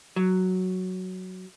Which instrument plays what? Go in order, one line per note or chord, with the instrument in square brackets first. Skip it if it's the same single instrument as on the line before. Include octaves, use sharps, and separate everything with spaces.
[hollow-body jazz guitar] F#3